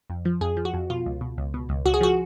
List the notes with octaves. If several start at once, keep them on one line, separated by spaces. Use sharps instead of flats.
F2
F3
F2 G#4
F3
F#4
F2
B2 F4
C#2
B2
C#2
B2
C#2
C#2 F#4
G#4
F3 F#4